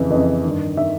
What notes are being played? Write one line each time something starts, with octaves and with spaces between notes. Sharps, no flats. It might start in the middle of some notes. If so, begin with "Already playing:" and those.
Already playing: F2 C#3 E3
F2 C#3 E3 D#5
G2 D#3
D#3 E5